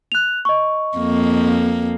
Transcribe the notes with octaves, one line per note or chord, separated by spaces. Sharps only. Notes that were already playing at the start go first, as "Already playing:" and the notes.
F#6 F7
D#5 C#6
F2 A#3